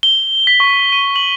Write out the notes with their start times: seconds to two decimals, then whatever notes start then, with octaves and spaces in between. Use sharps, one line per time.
0.03 G7
0.47 B6
0.60 C#6
0.92 D#7
1.16 F#7